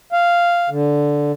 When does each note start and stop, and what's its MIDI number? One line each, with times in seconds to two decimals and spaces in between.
0.12 0.69 77
0.70 1.32 50